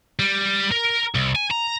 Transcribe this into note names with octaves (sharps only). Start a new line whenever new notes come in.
G3
A#4
C2
G#5
A#5